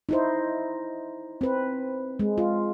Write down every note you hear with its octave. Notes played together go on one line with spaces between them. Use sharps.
D#4 E4 C5
C4 B4
G#3
F4